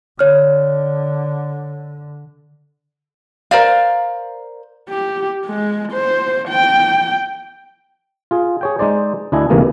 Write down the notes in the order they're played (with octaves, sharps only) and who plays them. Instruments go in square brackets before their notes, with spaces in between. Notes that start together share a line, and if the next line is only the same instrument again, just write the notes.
[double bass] D3 [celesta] C#5 F6
[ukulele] A#4 C5 D5 F5
[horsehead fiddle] G4
G#3
C5
G5
[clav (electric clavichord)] F4 G#4
G#4 C#5 G5
G#3 D#4 C5 D5
D2 D4 E4 D#5 G#5
D2 C3 D#3 E3 G#3 A#3